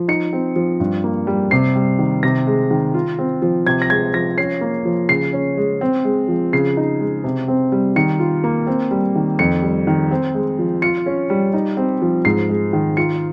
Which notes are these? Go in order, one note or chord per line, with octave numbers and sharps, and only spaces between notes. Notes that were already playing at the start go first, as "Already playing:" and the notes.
Already playing: F3
D#4 C#7
C4
F3
G2
A#3
G3
C3 C7
G3
D#3
C3 A#6
G#3
D#3
F4
C4
F3
C3 G#6
A#6
G#3 G#6
F3 A#6
C#4 C7
A#3
F3
C#3 C7
C#4
G#3
C4
G#3
F3
C#3 C7
D#4
G#3
C3
C4
G3
D#3 C#7
F4
A#3
C4
G3
D#3
F2 C#7
G3
D#3
C4
G#3
F3
F4 C#7
C#4
G3
D#4
C4
F3
G#2 C7
G#3
D#3
F4 C#7